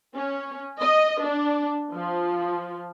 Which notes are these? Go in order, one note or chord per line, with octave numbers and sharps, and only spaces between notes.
C#4
D#5
D4
F3